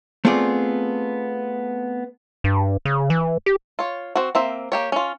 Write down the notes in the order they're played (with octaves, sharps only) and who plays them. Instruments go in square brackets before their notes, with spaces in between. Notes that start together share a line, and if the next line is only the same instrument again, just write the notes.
[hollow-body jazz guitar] A3 B3 C4 F4 G#4 D5
[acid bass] G2
C#3
E3
G4
[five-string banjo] F4 C#5
C4 F#4
A#3 C4 E5
A#3 G4 C#5
C#4 F4